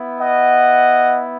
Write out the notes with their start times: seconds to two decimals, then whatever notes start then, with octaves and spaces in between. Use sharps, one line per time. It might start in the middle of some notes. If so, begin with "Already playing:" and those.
Already playing: B3 E4
0.21 D#5 F#5